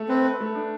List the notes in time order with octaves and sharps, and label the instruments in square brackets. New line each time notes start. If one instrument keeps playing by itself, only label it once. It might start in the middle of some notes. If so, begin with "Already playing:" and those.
Already playing: [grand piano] A3
[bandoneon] C4 [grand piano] B4
[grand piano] B4
A3
D4